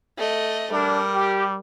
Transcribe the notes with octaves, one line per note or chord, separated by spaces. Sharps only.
A3 D#5
G3 D4 A#4
G4